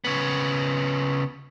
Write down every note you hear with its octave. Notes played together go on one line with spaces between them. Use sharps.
C#3 B3